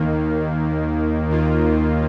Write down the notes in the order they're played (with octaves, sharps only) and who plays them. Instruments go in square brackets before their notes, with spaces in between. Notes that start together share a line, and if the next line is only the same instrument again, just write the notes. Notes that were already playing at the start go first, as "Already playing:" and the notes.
Already playing: [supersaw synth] D#2 D#3 A#3
D#2 D#3 A#3 F4